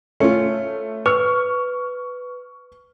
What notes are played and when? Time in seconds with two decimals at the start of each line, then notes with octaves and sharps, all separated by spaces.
0.20 A3 C#4 F4 C#7
1.06 B4 C#6 F6